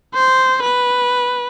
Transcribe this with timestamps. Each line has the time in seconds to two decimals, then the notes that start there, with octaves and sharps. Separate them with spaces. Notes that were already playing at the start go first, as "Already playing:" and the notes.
0.14 C5
0.63 B4